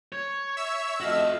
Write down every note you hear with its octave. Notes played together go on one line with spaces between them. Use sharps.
C#5
E5 E6
F2 A3 F#4 D#5 F5